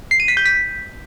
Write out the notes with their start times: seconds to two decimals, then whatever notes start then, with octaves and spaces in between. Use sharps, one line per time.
0.11 C7
0.20 D#7
0.28 B6
0.37 G6
0.46 B6